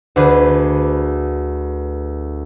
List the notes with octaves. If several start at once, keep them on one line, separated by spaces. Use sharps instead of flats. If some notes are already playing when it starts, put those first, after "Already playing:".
D2 D4 G#4 B4